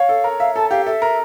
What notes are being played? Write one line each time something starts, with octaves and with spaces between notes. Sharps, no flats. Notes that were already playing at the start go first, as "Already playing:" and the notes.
Already playing: C#5 F5
A4
A#4
E5 F5
A4 A5
G4 F5
A4 E5
A#4